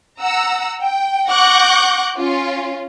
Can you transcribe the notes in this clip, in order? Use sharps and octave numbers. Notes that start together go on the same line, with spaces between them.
F#5 A#5 E6
G5
F#5 C#6 D6 F#6 G6 A#6
C#4 F4